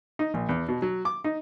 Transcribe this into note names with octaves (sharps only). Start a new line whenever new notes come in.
D#4
A#1
E2
B2
F#3
D6
D#4